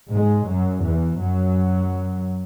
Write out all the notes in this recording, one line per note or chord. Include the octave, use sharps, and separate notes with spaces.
G#2 G#3
F#2 F#3
E2 E3
F#2 F#3